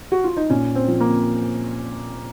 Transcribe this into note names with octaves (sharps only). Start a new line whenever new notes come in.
F#4
F4
D#4
A#2 C#4
C4
F3
A#3